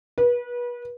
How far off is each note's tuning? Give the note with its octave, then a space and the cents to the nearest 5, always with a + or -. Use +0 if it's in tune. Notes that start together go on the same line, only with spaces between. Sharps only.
B4 -30